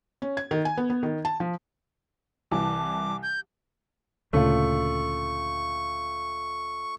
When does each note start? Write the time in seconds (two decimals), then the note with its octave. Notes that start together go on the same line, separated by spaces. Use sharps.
0.22 C#4
0.37 G#6
0.51 D#3
0.65 G#5
0.77 B3
0.90 B3
1.03 D#3
1.25 A5
1.40 F3
2.51 C2 E3 A5 D6
3.23 G6
4.33 D2 A#2 C#3 A3 F4 C#6